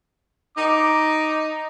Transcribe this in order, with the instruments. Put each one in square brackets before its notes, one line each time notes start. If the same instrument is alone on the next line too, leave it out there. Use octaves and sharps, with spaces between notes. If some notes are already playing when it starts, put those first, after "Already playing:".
[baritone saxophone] D#4 [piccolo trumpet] D6